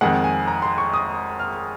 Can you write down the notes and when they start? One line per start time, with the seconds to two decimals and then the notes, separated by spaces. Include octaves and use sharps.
0.01 F2 D#3 G#3 F#5
0.24 G#5
0.47 A#5
0.62 C6
0.78 C#6
0.93 D#6
1.39 F6